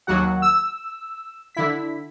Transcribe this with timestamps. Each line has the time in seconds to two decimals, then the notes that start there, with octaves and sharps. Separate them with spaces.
0.07 D#2 F#3 F#4 F#5
0.42 E6
1.55 D3 E4 B6